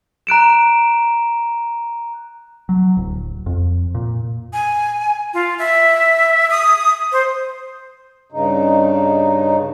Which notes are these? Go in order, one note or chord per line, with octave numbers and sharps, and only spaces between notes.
A#5 F#6 D7 E7
F#3
D1
F2
A#2
G#5
F4
E5
D#6
C5
G2 C#3 D#4